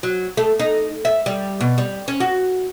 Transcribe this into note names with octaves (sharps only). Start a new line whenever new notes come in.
F#3
A3
D#4
E5
G3
B2
G3
C#4
F#4